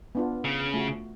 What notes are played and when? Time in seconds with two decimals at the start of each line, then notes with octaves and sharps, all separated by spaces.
0.15 B3 D4 F4
0.45 C#3
0.74 A3 F4 F#4